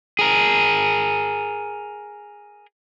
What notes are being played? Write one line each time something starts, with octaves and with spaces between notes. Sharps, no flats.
G#4 A#4